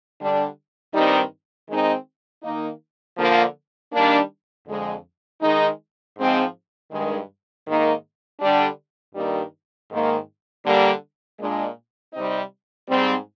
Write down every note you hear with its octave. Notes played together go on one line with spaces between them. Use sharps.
D3 G3 D4
G2 D#3 G3 C4 D#4
D#3 G#3 C4 D#4
D#3 A#3 D#4
D3 F3 A#3
D#3 G3 A#3 D4
F2 D3 G#3
D#3 G#3 D#4
G#2 F3 G#3 C4
G2 D#3 G#3
G#2 D#3 A#3 D#4
D3 G3 D4
G2 D#3 G3 A#3 D#4
G#2 D#3 A#3
D3 G3 A#3
A#2 G#3 D4
C3 G3 C4 D#4
G#2 G3 C4